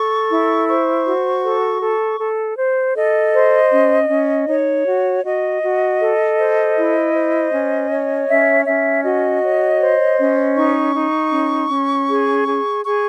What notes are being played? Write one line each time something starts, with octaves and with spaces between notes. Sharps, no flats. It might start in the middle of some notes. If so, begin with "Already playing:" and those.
Already playing: A4 C#6
E4
C5 C#6
F#4
A4
A4
A4
C5
A4 D#5
C5
C#4
C#4
D#4 C#5
F#4
F#4 D#5
F#4
A4
C5
E4
C5
C#4
C#5
C#4 E5
C#4 E5
F#4 D#5
C#5
C5
C#4
D#4 C#6
D#4
C#4
C#4
G#4
G#4
G#4 C#6